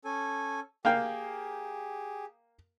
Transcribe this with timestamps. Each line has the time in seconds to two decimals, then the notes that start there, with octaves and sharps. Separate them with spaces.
0.05 C#4 A4 G#5
0.85 A#3 G4 G#4 F5 G5